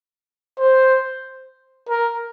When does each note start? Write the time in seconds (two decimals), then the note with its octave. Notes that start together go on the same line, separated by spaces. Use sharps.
0.58 C5
1.89 A#4